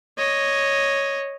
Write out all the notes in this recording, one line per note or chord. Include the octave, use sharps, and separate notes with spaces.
C#5 D#5